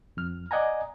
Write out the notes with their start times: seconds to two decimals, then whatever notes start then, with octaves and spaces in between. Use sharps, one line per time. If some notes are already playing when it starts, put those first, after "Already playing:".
0.17 F2 F6
0.51 D5 D#5 F#5 G#5 A#5